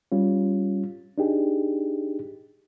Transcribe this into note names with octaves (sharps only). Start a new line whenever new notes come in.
G3 C#4 F4
D4 D#4 G4 G#4